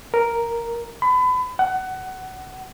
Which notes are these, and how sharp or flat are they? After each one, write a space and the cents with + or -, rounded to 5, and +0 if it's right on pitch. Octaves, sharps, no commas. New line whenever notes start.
A#4 +0
B5 +30
F#5 +20